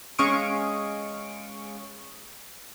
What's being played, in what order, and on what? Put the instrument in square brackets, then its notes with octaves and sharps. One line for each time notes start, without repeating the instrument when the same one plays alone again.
[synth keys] G#3 C#4 F5 C#6 D#6 D7